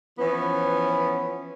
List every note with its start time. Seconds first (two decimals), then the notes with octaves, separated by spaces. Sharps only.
0.18 E3 F3 B3 C#4